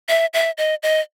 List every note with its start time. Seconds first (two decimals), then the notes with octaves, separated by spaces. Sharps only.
0.09 E5
0.34 E5
0.58 D#5
0.83 D#5